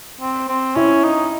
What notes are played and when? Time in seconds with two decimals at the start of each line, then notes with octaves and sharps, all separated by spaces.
0.21 C4
0.48 C4
0.76 C#4 E4
1.04 D#4